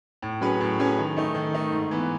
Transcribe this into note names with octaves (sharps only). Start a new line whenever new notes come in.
A2
F#3 C#4 G#4 B4
A2
F#3 C#4 G#4 B4
D#3
A3 D#4
D#3
A3 D#4
G#2
E3 B3